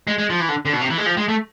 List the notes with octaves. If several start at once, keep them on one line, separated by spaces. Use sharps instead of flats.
G#3
G#3
F3
E3
D3
D3
B2
C3
E3
G#3
F3
G#3
A3